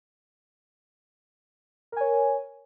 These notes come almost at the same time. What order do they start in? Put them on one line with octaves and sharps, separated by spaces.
A#4 G#5 C#5